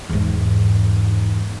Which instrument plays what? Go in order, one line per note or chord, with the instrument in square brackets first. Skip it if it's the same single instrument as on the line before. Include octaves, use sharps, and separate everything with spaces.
[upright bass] E2 G#2